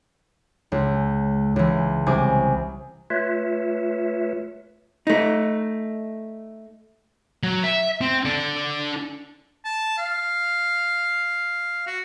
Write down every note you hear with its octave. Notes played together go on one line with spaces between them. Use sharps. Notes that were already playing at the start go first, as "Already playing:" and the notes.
C#2
C#2 E3
C2 G#5 D6
A3 F4 B4 C#5 E5
A3 D#4
F#3
E5
C4
D4 A4
A5
F5
F#4